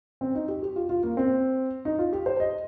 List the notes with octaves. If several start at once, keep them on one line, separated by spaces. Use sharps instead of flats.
C4
D#4
G4
G4
F4
F4
A#3
C4
D#4
F4
G4
C5
D#5